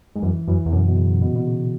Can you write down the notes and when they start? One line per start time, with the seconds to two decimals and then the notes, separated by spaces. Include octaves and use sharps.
0.16 G#2
0.22 F#2 E3
0.48 F#2 E3
0.66 E2
0.72 F#2 B2
0.87 B2
0.97 C#3
1.15 A#2
1.21 B2
1.36 B2
1.46 C#3